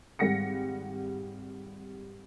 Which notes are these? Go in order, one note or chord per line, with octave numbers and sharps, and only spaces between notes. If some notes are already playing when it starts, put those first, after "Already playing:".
G#1 G3 F#5 A#6 C#7